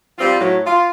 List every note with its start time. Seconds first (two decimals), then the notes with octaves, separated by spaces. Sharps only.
0.18 G3 C4 F4
0.40 A2 F#3
0.66 F4